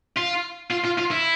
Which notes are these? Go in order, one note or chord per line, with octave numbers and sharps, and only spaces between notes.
F4
F4
F4
F4
E4